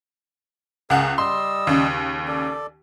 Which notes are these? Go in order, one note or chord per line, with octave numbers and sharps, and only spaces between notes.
C#2 G#4 A#4 F#5
G3 D#5 C6 E6
D#2 C#3
A4 D5